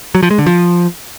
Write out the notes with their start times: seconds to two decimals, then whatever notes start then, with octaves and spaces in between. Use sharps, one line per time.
0.15 F#3
0.23 F3
0.31 G#3
0.38 D3
0.46 F3